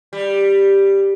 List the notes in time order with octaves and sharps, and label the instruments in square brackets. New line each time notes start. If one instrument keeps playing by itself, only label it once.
[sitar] G3